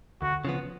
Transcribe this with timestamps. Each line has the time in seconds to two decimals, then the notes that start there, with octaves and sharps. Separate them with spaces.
0.22 D2 F#4
0.45 C#3 F3 B3